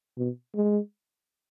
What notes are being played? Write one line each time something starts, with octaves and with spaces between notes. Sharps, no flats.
B2
G#3